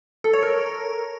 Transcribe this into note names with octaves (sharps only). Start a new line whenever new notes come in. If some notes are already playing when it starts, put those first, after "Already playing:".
A4
C#5
A#4